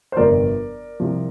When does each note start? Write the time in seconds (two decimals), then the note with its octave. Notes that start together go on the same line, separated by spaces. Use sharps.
0.12 C5
0.17 G1 F2 C3 F3 A#4 D5
1.00 C2 C3 F3